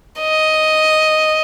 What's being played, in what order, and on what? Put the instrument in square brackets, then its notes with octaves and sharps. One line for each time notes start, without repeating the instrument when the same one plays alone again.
[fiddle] D#5